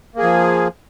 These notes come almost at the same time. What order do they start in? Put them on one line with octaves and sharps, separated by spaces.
A#3 G#4 F3